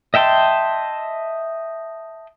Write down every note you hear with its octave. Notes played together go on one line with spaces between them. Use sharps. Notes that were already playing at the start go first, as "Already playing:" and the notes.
D#5 E5 G5 A5 C6